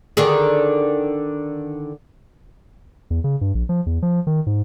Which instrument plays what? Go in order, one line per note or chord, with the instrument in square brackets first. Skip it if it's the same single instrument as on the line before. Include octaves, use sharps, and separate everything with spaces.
[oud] D3 D#3 G#4
[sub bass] E2
C#3
G2
A#1
F3
E2
F3
D#3
G#2